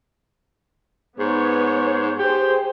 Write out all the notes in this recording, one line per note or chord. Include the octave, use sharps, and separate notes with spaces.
G#2 B3 C#5
G4 G#4 C5